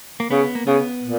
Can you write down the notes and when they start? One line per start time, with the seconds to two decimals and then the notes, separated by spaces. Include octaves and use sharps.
0.20 A#3
0.31 C#3 B3
0.55 A#3
0.67 C#3 B3
1.03 A#2